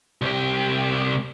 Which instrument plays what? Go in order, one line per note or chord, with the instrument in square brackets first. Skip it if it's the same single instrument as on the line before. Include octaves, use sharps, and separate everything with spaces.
[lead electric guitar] C2 G4